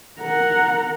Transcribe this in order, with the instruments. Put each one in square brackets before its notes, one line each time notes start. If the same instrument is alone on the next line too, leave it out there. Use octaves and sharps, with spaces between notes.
[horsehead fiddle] A#4 F#5